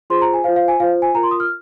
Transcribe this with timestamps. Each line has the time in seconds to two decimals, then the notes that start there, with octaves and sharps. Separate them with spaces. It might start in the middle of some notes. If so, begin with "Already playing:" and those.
0.10 F4 G#4 C5 C6
0.22 A#5
0.34 G#5
0.44 F4 C5 F5
0.56 F5
0.68 G#5
0.80 F4 C5 F5
1.02 G#5
1.15 F4 A#4 A#5
1.23 C6
1.31 D#6
1.40 F6